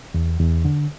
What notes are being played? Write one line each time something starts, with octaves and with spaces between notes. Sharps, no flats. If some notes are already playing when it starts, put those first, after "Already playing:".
E2
E2
D3